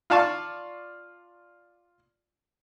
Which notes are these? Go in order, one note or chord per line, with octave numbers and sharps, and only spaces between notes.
F4 D5 F5 A5 C#6